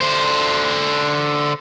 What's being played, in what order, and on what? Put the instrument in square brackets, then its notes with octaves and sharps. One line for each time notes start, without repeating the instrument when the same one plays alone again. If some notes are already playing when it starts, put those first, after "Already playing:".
[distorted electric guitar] D3 C5